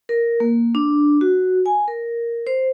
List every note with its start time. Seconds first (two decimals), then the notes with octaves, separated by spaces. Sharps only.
0.09 A#4
0.40 A#3
0.75 D4
1.21 F#4
1.66 G#5
1.88 A#4
2.47 C5